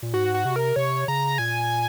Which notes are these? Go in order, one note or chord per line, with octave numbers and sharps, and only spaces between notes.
A#2
G#2 F#4
F#4
C3
A#4
C3 C#5
C#3 A#5
A#2 G#5